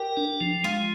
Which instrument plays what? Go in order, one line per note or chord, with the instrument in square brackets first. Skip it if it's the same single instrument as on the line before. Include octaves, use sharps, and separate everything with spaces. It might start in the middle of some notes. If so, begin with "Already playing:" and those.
Already playing: [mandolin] G4 [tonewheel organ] A#4
[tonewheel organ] D4
F3
[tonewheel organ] G#3 [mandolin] F4